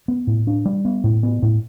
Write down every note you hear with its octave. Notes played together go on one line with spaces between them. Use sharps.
B3
A2
D4
G3
B3
A2
B3
A2